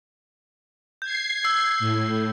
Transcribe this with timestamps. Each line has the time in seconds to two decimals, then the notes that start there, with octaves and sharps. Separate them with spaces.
1.02 G6 G#6 C7
1.45 E6
1.79 A2